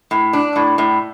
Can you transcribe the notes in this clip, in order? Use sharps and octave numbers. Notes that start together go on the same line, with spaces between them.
A2
D4
A2
A2